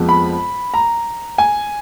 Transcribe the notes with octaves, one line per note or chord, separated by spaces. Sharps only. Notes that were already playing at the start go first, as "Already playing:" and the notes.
Already playing: F2 F3 G#3 B3
B5
A#5
G#5